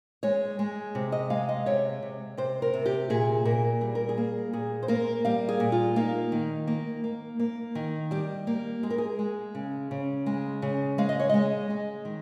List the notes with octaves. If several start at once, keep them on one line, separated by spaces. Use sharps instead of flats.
G#3 C#5
G#3
C3
D#5
G#3 F5
D#5
C3 C#5
C3
C3 C5
A#4
C3
G4
A#2 G#4
A#2 A#4
G3 G#4
A#4
G#4
A#3
A#2 G#4
C5
A#3 A#4
G3 F5
G#4
A#2
F4
A#3 D#4
D#3
A#3
A#3
A#3
D#3
G3 G4
A#3
G#3 G#4
A#4
G#4
G#3
C#3
C#3
G#3
C#3
G#3 F5
D#5
C#5
G#3 D#5
G#3
D#3